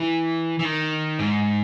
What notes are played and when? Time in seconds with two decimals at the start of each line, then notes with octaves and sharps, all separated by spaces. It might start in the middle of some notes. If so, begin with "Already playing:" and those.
Already playing: E3
0.59 E3
0.65 D#3
1.19 G#2